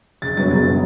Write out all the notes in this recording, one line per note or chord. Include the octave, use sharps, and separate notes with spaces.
F#1 A6
F#2 F#3 B3 A6
F#1 A6
F#3 B3